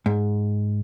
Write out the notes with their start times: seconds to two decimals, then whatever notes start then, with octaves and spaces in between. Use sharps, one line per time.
0.06 G#2